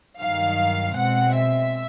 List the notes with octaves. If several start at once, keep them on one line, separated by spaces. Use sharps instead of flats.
G2 D#3 F#3 F5
B2 G#3 C4 F#5
E5